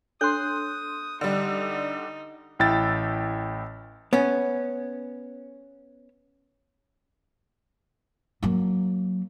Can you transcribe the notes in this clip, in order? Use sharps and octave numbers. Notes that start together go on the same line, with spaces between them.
D4 A4 C#5 C6 D#6 F#6 G6
D3 G3 D#4
A1 E4 G5 E6 A6
B3 C#4
F#3 A#3